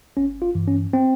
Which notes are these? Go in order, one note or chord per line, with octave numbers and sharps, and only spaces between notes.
G1 C#4
F4
G2 E3
C#4
C4